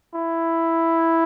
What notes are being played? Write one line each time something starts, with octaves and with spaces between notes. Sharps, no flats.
E4